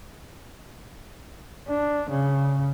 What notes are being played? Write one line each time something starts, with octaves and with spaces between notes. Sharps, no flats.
D4
C#3